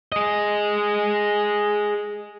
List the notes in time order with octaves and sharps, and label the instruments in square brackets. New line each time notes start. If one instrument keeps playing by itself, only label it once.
[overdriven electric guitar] G#4 D#5